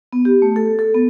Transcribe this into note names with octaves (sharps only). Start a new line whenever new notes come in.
B3
G4
A3
A4
A4
B3